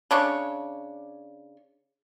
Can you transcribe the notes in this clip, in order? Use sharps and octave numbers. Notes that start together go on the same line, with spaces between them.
C#3 D4 C#5